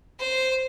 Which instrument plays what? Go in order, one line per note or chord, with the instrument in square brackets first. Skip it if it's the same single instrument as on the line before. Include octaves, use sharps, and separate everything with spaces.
[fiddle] C5